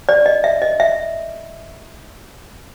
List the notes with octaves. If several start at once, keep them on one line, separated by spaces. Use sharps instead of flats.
D5
D#5
E5
D#5
E5